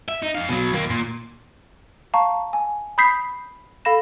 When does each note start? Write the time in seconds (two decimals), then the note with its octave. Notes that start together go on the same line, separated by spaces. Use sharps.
0.09 E5
0.22 D#4
0.35 F2 F5
0.49 B2 F#3
0.73 D#2 A#3
0.90 A#2
2.14 F5 A5 A#5 C#6
2.53 G#5
2.98 B5 D#6 G6 B6 C7
3.85 A4 F5 B5 A#6 E7